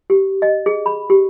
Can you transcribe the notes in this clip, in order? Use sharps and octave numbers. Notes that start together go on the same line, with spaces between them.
G4
D#5
G#4
B5
G4